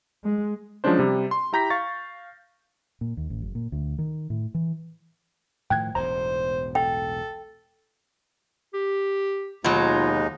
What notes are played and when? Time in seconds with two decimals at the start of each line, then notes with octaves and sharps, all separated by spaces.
0.24 G#3
0.84 F3 F#3 G#3 C#4 D4 C5
0.99 C3 G3
1.31 C6
1.53 E4 G4 A#5 G6 A#6 B6
1.70 F5 C#6 A6
3.01 A#2
3.17 D#2
3.30 A1
3.42 F#1
3.55 A#2
3.72 D2
3.99 D#3
4.30 A2
4.54 E3
5.70 A2 D#3 F3 G5 F#6 G#6
5.95 E1 B1 A2 C5 A#5
6.75 A4 G5
8.74 G4
9.64 D#2 B2 F#3 G#3 D#4 F4